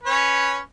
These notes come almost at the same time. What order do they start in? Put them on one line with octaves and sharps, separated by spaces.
B4 C#5 C#4